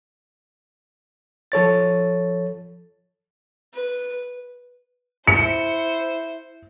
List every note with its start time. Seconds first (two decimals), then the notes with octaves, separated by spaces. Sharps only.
1.52 F3 A4 C#5 A6
3.73 B4
5.27 E4 C5 C#7